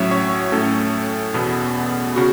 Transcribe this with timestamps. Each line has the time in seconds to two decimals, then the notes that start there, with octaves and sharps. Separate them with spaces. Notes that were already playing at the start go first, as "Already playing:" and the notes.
Already playing: A2 F#3 C#4 C#5 E5
0.11 C#5
0.52 A2 A3 C#4 A4
1.34 E2 B2 B3
2.16 C#3 F#4